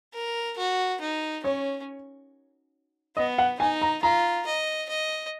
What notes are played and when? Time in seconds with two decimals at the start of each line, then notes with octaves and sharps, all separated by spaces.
0.14 A#4
0.57 F#4
1.01 D#4
1.44 C#4 C#5
3.16 B3 D#5
3.38 F#5
3.59 D#4 G#5
3.82 A#5
4.02 F4 A#5
4.46 D#5
4.89 D#5